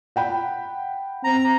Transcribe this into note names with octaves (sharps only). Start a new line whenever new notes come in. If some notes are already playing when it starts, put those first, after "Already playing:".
F#5 G5 B5
C4 A#5